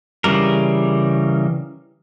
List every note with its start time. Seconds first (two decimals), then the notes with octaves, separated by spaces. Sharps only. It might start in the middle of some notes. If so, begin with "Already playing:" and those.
0.24 C#3 E3 G3 A#4